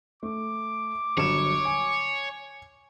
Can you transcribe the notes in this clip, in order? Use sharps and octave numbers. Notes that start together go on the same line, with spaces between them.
A3 D6
G1 F#3 C#5 E7
G#5